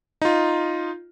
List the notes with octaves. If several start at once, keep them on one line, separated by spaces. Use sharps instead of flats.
D#4 F4